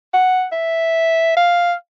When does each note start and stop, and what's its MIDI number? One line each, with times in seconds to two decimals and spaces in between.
0.14 0.45 78
0.52 1.34 76
1.37 1.73 77